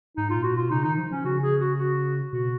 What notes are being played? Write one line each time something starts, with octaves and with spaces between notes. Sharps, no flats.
G#2 D#4
F4
A#2
F#4
B2 F4
C#3 D#4
D#3 D#4
F3
F3 C#4
C#3 F#4
G#4
F#4
F#4
B2 F#4